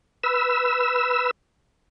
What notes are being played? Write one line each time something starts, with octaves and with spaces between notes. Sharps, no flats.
B4 E6